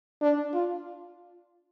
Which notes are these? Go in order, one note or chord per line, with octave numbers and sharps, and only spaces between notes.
D4
F4